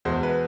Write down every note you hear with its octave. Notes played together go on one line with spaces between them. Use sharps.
E2 B2 G#3 C5
B4